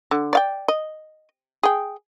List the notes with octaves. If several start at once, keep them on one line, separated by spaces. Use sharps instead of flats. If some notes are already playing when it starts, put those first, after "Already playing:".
D3
D5 F5 G5
D#5
G#4 G5